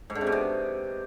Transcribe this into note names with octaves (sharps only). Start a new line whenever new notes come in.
G#2
D3
C3
B2
C3